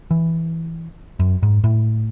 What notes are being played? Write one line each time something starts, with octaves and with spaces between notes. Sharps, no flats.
E3
F#2
G#2
A2